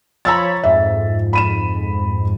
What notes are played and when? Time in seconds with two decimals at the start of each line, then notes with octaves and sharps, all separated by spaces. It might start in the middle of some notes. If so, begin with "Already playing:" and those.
0.25 F3 C#5 A#5 B5 E6 A6
0.64 F2 G#2 E5
1.33 B5 D#7 E7